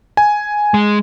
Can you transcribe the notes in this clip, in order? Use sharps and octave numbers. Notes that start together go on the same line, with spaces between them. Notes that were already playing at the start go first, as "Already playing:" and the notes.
G#5
G#3